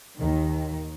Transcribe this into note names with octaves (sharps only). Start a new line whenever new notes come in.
D#2 D#3